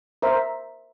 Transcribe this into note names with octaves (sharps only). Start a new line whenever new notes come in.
A#4 C5 E5